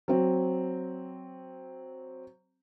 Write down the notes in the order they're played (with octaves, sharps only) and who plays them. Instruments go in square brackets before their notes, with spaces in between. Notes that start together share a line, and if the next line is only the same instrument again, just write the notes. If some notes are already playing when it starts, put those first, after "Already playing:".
[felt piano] F#3 C4